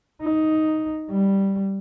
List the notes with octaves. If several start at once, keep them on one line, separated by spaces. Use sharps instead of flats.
D#4
G3